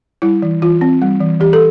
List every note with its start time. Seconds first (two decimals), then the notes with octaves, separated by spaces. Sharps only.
0.22 G3 E4
0.42 E3
0.62 E3 F4
0.81 C4
1.02 G3
1.21 E3
1.40 E3 G4
1.53 A4